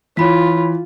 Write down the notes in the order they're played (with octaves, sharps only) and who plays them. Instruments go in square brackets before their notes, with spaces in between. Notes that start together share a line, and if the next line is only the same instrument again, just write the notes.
[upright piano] E3 [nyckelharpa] F4 [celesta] C#5 B5 B6